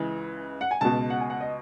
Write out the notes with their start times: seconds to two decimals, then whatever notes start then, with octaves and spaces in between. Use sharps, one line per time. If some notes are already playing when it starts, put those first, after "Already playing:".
Already playing: C#2 C#3 E3
0.61 F#5
0.71 G#5
0.81 C#2 B2 A5
1.10 F#5
1.21 G#5
1.30 F#5
1.41 D#5